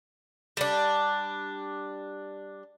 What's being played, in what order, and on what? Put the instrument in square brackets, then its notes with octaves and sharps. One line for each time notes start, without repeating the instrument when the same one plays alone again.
[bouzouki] G3 D4